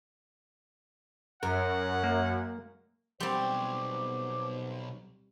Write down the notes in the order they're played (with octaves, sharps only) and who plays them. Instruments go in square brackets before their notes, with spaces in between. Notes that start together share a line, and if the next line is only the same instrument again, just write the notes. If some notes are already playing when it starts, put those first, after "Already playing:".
[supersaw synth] F#2 [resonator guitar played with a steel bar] A#4 [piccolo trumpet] F#5
[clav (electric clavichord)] A#3
[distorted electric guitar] B1 C6 [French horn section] B2 C5 [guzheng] G3 C4 [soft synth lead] D6